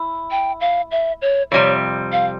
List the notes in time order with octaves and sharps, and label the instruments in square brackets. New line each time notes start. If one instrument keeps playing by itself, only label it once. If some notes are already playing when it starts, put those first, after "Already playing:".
Already playing: [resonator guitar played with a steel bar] E4
[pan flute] G5
F5
E5
C#5
[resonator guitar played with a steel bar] F2 C3 G3 [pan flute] C#5
[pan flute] F5